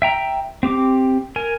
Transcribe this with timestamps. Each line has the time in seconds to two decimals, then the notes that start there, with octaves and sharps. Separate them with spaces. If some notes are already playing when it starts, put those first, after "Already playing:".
0.02 E5 G5 A#5
0.63 C4 G4 D6
1.36 A#4 G#5